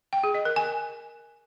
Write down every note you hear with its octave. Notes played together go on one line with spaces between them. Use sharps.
G5
G#4
D#5
A#4
G#5